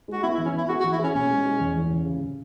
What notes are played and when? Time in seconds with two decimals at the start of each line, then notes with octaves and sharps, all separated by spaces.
0.08 G#3 F#4
0.23 B3 E4
0.35 E4
0.38 E3
0.46 C#4
0.54 B3 E4
0.69 F#4 G#4
0.80 F#4
0.84 E3
0.92 E4
0.99 C#4 G#4
1.15 B2 C#4
1.30 G#3
1.45 G#3
1.60 E2
1.76 E3
1.90 C#3
2.06 C#3
2.21 C#3